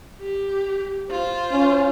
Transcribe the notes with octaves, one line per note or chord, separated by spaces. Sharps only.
G4
F4 C5
C#4